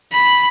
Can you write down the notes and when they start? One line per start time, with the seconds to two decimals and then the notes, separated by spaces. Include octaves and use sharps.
0.13 B5